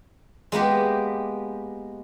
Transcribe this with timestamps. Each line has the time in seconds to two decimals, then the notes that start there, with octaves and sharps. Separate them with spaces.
0.52 G#3 A#3 B3 G4